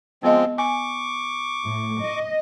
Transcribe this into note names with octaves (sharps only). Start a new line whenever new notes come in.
F3 G#3 B3 C4 D#5
G#5 C#6 D6
A2
D#5